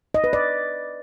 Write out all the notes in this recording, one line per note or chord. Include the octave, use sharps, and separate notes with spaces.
D#5
B4
D5